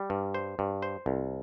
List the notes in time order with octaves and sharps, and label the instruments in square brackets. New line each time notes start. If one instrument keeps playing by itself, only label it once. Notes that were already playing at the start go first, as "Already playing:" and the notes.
Already playing: [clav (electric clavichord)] G3
G2
C5
G2
C5
C2